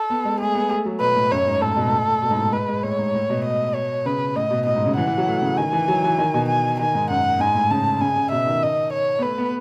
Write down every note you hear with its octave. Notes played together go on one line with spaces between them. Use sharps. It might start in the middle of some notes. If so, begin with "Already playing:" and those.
Already playing: A4
B3
G#3
A3 G#4
B3
A3
F#3
B2 B4
A2
F#2 C#5
G#2
A2 A4
B2
G#2
A2
A2
B2
G#2
A2
G#3 B4
G#3
A2 C#5
G#2
A2
B2
D#5
C#5
C#3 B4
A2 D#5
B2
A2 D#5
G#2
C#3
E3 F#5
E3
F#3
A3
C#3
D#3 G#5
E3
F#3
E3
D#3
B2
G#5
D#3 G#5
G#2
F#2 F#5
G#2 G#5
A2
C#3 A5
C#3 G#5
C#3
B2 E5
D#3
D#5
C#5
B3
A3 B4
B3